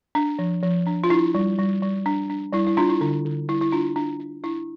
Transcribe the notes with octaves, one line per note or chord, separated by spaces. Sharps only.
D4
F3
F3
D4
F4
D4 E4
G3
G3
G3
D4
D4
G3 E4
E4
D4 F4
E4
D3 D4
D3
G3 E4
E4
D4 F4
D4
D4
D4 E4